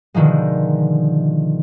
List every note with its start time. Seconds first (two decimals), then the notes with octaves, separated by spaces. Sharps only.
0.14 B2 D3 D#3 F3 G#3